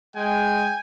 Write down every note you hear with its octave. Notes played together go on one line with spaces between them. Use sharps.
G#3 G5 G#5